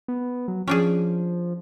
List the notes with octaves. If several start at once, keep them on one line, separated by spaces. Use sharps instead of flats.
B3
F#3
F3 C#4 D4 G#4